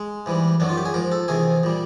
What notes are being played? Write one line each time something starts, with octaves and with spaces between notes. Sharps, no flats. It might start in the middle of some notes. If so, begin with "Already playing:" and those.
Already playing: G#3
G#2 E3 G3
F#2 D#3 F#3 D4
F4
G4
G#4
G#2 F3 A#4
A4
E2 C3 D#3 G#4
A#2 G3